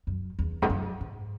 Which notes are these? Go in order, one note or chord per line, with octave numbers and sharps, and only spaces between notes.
F#2
E2
G#2
F#2
G#2